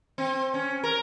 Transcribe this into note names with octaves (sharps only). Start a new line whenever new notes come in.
C4
C#4
A#4